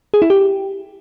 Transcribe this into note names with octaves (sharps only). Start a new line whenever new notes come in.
G#4
E4
G4